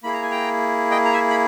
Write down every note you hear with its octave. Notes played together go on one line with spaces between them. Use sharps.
A#3 E4 G#4 B5
A#5
G#5
G5 A#5
D#5 G5
A#5
E5 G#5
B5